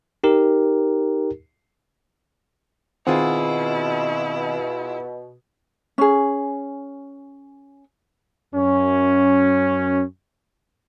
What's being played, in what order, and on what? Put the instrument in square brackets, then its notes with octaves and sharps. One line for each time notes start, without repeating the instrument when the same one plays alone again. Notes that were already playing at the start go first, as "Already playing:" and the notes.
[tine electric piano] D#4 G4 A#4
[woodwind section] B2 [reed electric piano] D#3 C4 [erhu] E4 [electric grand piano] F4 G#4 F#5
[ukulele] C#4 G#4
[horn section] F#2 C#4